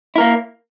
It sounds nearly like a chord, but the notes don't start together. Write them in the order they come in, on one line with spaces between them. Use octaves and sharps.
E4 A#4 A#3